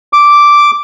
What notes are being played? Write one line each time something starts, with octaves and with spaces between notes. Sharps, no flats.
D6